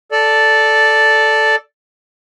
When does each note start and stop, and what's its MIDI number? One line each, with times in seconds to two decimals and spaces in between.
0.12 1.56 69
0.12 1.56 74